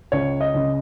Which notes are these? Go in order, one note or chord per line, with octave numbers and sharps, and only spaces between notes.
C#2 C#5
D#5
C#3